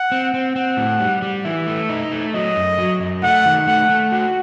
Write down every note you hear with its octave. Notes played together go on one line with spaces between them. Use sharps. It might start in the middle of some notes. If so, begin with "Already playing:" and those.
Already playing: F#5
C4
C4
C4 F#5
A2
G3
G3
E3 E5
A3
D#4
A3
F#3 D#5
F#2
F#3
F#2
A3 F#5
D#3
A3 F#5
A3
F#4 F#5